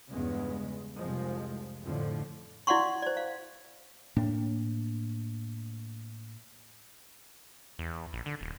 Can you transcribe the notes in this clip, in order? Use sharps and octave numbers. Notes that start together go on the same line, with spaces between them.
E2 G2 C#3 G#3 B3
F1 C2 F3 G#3
F2 A2 D3 F3
E4 D5 F5 F#5 C6 C#6
C5 D5
F5
A2 A#3 D4
E2
A#1
D3
D#1